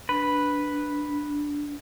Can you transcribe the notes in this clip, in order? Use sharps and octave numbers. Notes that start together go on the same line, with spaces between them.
D4 B4